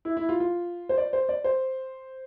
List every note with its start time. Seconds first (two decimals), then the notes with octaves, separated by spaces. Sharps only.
0.05 E4
0.17 E4
0.29 F4
0.40 F4
0.89 C5
0.98 D5
1.13 C5
1.29 D5
1.44 C5